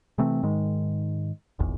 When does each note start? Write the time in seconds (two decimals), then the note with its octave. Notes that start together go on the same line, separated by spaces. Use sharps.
0.18 C3 E3 A3 C4
0.43 G#2 D#3 G#3
1.59 D#1 G#1 E2